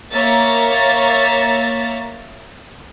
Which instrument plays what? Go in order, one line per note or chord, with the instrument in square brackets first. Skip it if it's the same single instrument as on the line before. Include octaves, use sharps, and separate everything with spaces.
[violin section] A#3 C#5 E5 A#5 A6